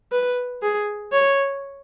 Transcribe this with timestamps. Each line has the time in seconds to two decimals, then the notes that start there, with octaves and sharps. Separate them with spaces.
0.12 B4
0.63 G#4
1.12 C#5